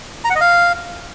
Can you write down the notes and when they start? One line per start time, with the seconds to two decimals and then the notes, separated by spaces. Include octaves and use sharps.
0.24 A#5
0.30 F#5
0.35 D#5
0.41 F5